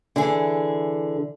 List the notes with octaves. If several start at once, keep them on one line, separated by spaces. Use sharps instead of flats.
D3 E3 G#4